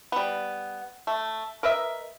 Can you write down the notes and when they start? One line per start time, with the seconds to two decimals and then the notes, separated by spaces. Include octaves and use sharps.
0.12 G3 B3
1.07 A3
1.63 A#4 B4 D#5 E5